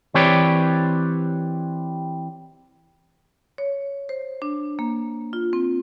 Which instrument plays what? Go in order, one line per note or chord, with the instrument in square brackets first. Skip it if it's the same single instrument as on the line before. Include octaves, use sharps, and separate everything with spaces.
[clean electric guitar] E3 C4 G4 B4 C#5 D5
[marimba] C#5
C5
D4
A#3
F4
C4